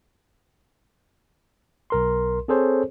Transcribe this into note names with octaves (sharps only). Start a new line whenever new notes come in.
B1 A#4 C6
C4 G#4 A4 C5 C#5